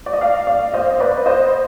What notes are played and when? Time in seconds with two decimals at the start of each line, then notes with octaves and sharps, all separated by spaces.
0.06 D5
0.13 D#5
0.21 D5 F5
0.47 D5 F5
0.74 C5 D#5
1.00 B4 D5
1.26 C5 D#5